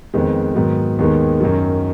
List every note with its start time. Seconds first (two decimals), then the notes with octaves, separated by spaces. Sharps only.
0.14 F2 D#3 G#3 B3
0.56 G#2 D#3 F#3 B3
0.99 D#2 D#3 G#3 B3
1.41 F#2 D#3 F#3